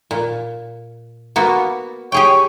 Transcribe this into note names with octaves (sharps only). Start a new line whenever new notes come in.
A#2
A#3 B3 F#4
G4 G#4 C#5 G5